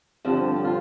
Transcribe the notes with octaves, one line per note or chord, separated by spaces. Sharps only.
G2 D3 F3 C4
G4
F4